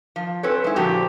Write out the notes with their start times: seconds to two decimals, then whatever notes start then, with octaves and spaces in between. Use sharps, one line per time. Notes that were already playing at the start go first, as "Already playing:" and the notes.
0.16 F3
0.43 C4 C#4 A4 B4 C#5
0.64 G#3 E4
0.76 A#2 D3 F3 F#4 G4